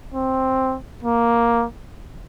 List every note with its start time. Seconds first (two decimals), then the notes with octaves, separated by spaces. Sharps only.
0.14 C4
1.03 A#3